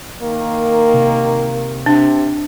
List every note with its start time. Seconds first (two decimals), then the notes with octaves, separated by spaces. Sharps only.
0.22 D#3 A#3
0.94 C3
1.86 C3 D4